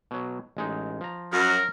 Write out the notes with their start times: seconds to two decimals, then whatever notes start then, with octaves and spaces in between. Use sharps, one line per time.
0.11 B2 F#3
0.57 A1 G#3 D#4
1.01 F3 A#5
1.33 F#2 F#3 A#4